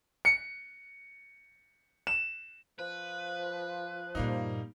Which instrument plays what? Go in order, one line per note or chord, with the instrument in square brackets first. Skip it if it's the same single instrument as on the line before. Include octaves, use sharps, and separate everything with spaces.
[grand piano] C#7
E7
[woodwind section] F3 [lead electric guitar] B4
[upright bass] G2 A#2 [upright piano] G3 A#3 D#4